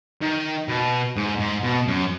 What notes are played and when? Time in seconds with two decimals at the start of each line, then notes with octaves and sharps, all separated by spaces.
0.22 D#3
0.68 B2
1.17 G#2
1.40 G#2
1.63 B2
1.88 F#2